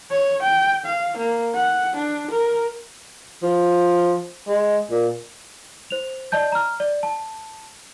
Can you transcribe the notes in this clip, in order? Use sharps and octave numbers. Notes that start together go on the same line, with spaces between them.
C#5
G5
F5
A#3
F#5
D4
A#4
F3
G#3
A#2
C5 F7
D5 D#5 A5 G6
A#5 F6
D5
A5